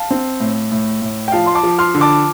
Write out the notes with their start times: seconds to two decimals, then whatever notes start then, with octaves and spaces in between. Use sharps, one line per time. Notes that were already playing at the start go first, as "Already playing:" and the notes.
Already playing: F5 A5
0.11 C4
0.40 A2
0.72 A2
1.02 A2
1.28 G5
1.32 F3 F5 A5
1.46 C6
1.55 A5 D6
1.63 F3
1.79 C6 F6
1.95 D3
2.01 A5 D6